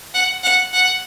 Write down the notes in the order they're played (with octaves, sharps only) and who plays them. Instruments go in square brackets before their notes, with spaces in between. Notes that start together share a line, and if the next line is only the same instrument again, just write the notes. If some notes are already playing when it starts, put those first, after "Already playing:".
[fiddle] F#5
F#5
F#5